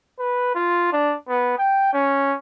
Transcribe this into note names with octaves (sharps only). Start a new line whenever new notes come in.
B4
F4
D4
B3
G5
C#4